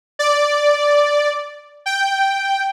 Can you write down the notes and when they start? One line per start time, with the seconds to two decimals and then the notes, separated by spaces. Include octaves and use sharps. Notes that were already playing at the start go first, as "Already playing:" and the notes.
0.19 D5
1.86 G5